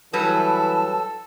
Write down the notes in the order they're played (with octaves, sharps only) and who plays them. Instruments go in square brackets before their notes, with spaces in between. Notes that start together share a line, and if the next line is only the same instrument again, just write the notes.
[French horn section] E3 [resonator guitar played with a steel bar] F#3 G3 B4 [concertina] A4 [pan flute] A5